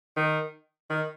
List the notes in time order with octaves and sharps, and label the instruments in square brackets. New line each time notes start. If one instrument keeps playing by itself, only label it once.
[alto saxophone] D#3
D#3